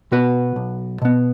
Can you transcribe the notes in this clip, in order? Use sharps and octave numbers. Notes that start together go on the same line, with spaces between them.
B2 B3 F#4 B4
B1
B2 B3